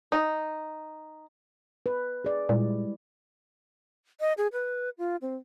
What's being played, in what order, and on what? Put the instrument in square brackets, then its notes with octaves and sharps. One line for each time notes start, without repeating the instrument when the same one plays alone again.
[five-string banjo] D#4
[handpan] B4
G#4 D5
[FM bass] A#2 [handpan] G3 G#3 E4
[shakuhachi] D#5
G#4
B4
F4
C4